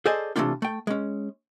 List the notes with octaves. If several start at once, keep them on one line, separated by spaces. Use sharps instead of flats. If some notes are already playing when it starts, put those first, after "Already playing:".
G#4 A4 C5 D5 D#5 G#5
C3 D#3 E3 A3 D4 F4
A3 G5
G#3 C#4